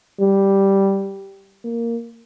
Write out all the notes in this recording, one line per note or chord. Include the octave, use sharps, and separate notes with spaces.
G3
A#3